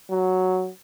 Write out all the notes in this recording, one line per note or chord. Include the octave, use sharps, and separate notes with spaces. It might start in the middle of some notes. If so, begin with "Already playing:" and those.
F#3